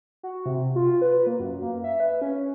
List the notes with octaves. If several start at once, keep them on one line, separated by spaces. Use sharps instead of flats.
F#4
C3
F4
B4
A#3
F#2
A#3
E5
B4
C#4